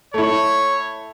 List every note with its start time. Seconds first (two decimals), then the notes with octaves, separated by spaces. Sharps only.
0.14 A3 E4 C#5